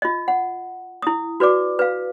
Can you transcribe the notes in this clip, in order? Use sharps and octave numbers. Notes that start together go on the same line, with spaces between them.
F4 D#5
F#5
E4 D#6
F#4 B4 D5 D6
B4 F5